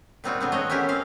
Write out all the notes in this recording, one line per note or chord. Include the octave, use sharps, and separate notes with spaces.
A#2 G3 C4 D#4 F4 F#4
D3 B3 C4
A3 F#4 C#5 D#5
C#4 E4 G4 G#4 A#4
C4 F5